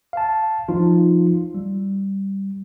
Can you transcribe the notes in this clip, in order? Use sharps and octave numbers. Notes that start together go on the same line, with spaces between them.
F5 A5
F3 D#4 F4
G3